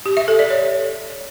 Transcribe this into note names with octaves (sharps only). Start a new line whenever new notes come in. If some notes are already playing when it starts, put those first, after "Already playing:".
G4
E5
A4
D5
C#5